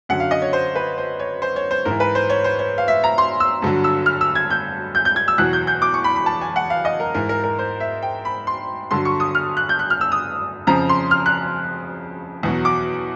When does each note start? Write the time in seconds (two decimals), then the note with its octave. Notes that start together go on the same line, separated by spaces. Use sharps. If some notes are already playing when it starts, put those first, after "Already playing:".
0.09 F#2 D3 F#3 F#5
0.20 F5
0.31 D#5
0.42 C#5
0.53 C5
0.76 B4
0.98 C5
1.19 C#5
1.42 C5
1.56 C#5
1.71 C5
1.85 G#2 E3 A#4
2.00 B4
2.15 C5
2.30 C#5
2.44 C5
2.59 C#5
2.78 F5
2.88 E5
3.04 A#5
3.18 C6
3.40 E6
3.62 G2 D3 F#3
3.84 E6
4.06 F6
4.21 E6
4.35 G#6
4.50 G6
4.95 G6
5.05 G6
5.16 G#6
5.28 E6
5.38 E2 B2 F#3 F#6
5.53 G6
5.67 G6
5.82 D6
5.94 C#6
6.04 B5
6.16 B5
6.26 A5
6.41 G#5
6.56 F#5
6.70 F5
6.85 D#5
7.00 A#4
7.14 G#2 E3 A#4
7.29 A#4
7.44 A#4
7.59 C5
7.80 E5
8.02 G5
8.25 B5
8.47 C6
8.91 G2 D3 F#3 C6
9.05 C#6
9.20 D#6
9.35 F6
9.57 F#6
9.69 G6
9.79 F#6
9.90 F6
10.01 E6
10.12 D#6
10.67 F2 C#3 F3 A#5
10.89 C6
11.11 F6
11.26 F#6
12.43 E2 B2 F#3
12.65 D6